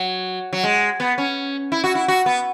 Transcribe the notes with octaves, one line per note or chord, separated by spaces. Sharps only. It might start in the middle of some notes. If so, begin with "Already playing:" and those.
Already playing: F#3
F#3
G#3
B3
C#4
E4
F#4
E4
F#4
B3